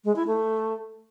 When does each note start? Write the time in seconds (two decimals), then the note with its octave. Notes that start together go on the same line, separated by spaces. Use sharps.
0.05 G#3
0.16 E4
0.27 A3